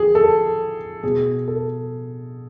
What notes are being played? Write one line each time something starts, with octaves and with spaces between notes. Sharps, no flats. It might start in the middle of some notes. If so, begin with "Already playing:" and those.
Already playing: C3 F3 G4 G#4
A4
B2 G#4
A4